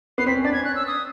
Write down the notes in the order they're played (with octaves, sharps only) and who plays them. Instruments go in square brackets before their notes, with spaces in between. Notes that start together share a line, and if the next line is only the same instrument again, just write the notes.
[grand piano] B3 [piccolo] C7
[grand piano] C4 [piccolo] B6
[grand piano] C#4
[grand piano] D4 [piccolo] A6
[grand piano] C#4 [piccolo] G#6
[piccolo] F#6
E6
D#6